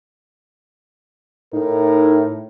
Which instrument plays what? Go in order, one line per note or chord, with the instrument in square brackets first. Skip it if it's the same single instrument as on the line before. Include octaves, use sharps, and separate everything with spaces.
[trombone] A2 [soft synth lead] D#4 [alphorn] A#4